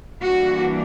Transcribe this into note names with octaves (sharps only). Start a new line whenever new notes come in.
E3 G3 A#3 D4 F#4